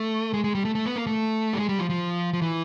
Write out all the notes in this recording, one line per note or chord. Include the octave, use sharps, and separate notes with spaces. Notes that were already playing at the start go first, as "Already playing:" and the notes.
Already playing: A3
G#3
G#3
G3
A3
A3
B3
A#3
A3
G3
G#3
G3
F3
F3
F3
E3